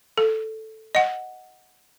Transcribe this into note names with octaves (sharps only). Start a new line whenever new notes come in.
A4
D#5 F#5